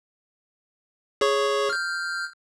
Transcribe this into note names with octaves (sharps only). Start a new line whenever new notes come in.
G#4 C#5 C#6
F6 G6